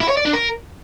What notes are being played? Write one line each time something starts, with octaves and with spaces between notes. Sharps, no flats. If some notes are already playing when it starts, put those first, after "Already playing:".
E4
C#5
D5
D4
A#4